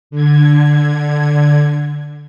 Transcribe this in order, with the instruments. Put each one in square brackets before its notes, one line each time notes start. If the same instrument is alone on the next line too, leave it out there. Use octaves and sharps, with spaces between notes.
[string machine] D3 G#6